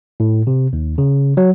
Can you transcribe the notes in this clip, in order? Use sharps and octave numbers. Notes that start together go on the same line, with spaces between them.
A2
C3
D#2
C#3
F#3